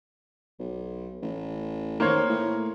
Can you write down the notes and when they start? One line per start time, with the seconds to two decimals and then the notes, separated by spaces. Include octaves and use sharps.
0.59 B1
1.22 A1
2.00 D#3 A#3 C5 C#5
2.29 A2